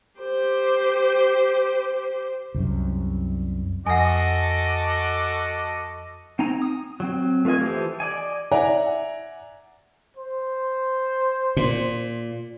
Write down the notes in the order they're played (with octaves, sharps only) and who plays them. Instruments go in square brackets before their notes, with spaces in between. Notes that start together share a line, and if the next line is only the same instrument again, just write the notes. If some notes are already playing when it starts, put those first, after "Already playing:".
[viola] G4 C5
[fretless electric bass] C2 F#2
[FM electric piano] F2 A#6 [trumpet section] F#4 A4 D6 [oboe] D#5 [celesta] F#5 G#5
[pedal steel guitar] C4 D#4 G#5 A#5
D#6
F#3 C4
A3 F4 B4 D#5 G#5
E3 G4 A4 C5
D5 D#5 G#5
[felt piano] D5 E5 F#5 G#5 A#5
[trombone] C5
[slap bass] A#2